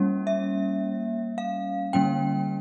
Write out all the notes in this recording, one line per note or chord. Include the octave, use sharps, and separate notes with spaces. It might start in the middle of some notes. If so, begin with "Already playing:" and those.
Already playing: G3 A#3 C#4
E5
F5
D3 G3 A#3 C#4 G5